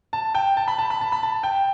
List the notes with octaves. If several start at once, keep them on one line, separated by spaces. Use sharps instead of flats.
A5
G5
A5
B5
A5
B5
A5
B5
A5
G5